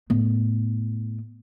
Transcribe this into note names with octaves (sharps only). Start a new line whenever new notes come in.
A2 B3